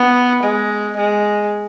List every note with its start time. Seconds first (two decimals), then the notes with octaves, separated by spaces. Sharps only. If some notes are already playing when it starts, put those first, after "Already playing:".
Already playing: B3
0.43 G#3
0.97 G#3